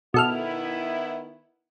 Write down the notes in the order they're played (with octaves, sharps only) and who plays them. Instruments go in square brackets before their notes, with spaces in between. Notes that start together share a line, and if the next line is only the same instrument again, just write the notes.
[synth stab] B2 A4 F6 [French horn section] D#3 B3 E4